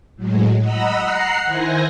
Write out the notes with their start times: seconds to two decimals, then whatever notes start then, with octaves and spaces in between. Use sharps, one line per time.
0.16 A2 F#3 G#3
0.59 D#5 F#5 A#5 B5 E6
1.00 F#5 A#5 F#6 C7
1.44 D#3 E4 C5 G#5 A#6